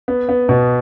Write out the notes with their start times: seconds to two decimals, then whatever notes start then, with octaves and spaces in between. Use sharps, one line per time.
0.08 B3
0.29 B3
0.49 B2